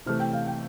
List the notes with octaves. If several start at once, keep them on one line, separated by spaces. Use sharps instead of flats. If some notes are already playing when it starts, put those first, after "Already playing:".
C3 E3 A3 F6
G5
F5
G5